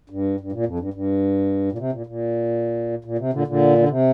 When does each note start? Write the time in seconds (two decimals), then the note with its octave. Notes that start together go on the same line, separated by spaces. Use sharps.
0.10 G2
0.40 G2
0.52 A#2
0.66 F2
0.79 G2
0.94 G2
1.72 A#2
1.78 C3
1.92 A#2
2.07 A#2
3.04 A#2
3.18 C3
3.33 A#2 D3
3.47 A#2 D3
3.78 D3
3.89 C3